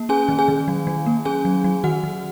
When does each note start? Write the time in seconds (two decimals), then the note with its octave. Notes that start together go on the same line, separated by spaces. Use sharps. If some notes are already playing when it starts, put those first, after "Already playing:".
Already playing: A#3
0.09 C#4 G#4 G#5
0.29 D#3
0.39 G#4 G#5
0.48 D#3
0.68 F#3
0.87 F#3
1.06 A#3
1.25 C#4 G#4 G#5
1.45 F#3
1.64 F#3
1.84 D#3 F#4 F#5
2.04 D#3